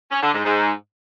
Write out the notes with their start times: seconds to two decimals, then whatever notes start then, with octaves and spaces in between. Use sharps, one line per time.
0.12 C#4
0.23 D3
0.34 G#2
0.45 G#2